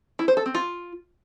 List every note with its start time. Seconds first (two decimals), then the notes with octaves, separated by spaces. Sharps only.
0.19 E4
0.28 C5
0.37 A4
0.46 C4
0.55 F4